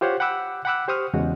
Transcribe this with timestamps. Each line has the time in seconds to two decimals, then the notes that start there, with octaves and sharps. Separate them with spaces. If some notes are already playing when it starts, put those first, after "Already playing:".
0.01 F4 G4 C5 C#5 F#5
0.20 F#5 G5 B5 D6 E6 F#6
0.65 F#5 G5 B5 D6 E6 F#6
0.88 G4 C5 C#6 D#6 F6
1.14 E2 C#3 G#3 F#4